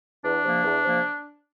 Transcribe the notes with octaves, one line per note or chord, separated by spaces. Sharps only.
E2 D4
C3 F3 A#3
E2
C3 F3 A#3